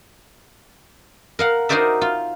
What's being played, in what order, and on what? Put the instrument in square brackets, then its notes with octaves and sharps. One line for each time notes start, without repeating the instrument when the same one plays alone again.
[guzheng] A#4 F5 F#5
D#4 F#4 A#4 C5 D5 E5
F4